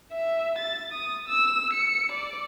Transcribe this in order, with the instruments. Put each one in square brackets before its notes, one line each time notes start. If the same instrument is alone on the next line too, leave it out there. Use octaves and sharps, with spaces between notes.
[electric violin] E5
A6
D#6
E6
C#7
D5